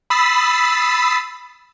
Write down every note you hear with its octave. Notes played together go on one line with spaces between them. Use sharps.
B5 D#6 E6 A6 B6 C7